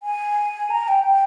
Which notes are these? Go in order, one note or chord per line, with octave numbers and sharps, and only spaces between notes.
G#5
A#5
G5
G5